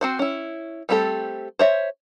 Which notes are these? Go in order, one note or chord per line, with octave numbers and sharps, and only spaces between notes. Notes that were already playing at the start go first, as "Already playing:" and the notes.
C4 F#4 C5
C#4 E4
G3 A3 C4 G4 A4
C5 C#5 E5